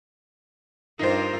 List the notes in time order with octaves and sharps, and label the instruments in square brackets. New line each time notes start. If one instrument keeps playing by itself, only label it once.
[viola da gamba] G2 F4 A#4 [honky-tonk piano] D#4 C5